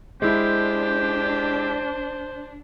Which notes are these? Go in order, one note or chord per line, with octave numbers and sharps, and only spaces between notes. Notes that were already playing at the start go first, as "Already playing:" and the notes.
G#3 D4 E4 G4 C5